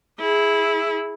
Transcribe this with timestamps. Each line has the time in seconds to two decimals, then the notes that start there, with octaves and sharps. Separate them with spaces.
0.20 E4 G#4